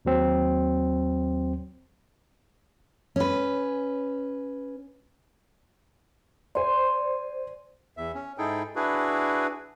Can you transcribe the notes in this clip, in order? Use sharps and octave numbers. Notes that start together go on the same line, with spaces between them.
D#2 F#3 C4
C#4 B4
C5 D5 G#5 C6
E2 E5
C#4
G#2 D#4 E4 G#4 A4 G5
D4 E4 F#4 G#4 B4